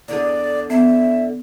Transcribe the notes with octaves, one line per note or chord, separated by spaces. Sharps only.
E2 D3 G#4 D5
B3 E5